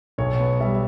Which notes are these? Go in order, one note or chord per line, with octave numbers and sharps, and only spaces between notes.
B1 C#5
B3
G3 E5